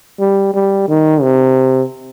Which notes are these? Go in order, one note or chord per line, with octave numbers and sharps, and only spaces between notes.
G3
G3
D#3
C3